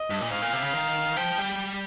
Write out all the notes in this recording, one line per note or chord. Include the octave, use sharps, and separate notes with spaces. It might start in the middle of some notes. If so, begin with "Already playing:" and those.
Already playing: D#5
G2
A#2
G#2 F5
A#2
C3
C#3
D#3
F3 G5
G3